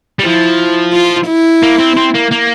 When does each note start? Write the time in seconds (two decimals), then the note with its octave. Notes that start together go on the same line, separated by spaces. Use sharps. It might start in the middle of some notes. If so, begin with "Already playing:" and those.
0.19 G3
0.23 F3 E4
0.93 F4
1.27 E4
1.63 A#3
1.79 C4
1.97 C4
2.14 A#3
2.31 A#3